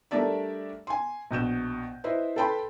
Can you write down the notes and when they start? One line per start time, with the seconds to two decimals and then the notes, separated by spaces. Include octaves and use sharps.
0.11 G3 A3 D4 A#4 D5 E5
0.87 G#5 C6
1.31 A#1 B2 G6 E7
2.04 E4 B4 C5 D#5 E5
2.36 A4 B4 G5 A5 B5 C6